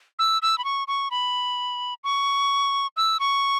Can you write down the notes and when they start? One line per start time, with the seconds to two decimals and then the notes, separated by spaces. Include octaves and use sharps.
0.19 E6
0.42 E6
0.58 B5
0.64 C#6
0.88 C#6
1.11 B5
2.04 C#6
2.97 E6
3.20 C#6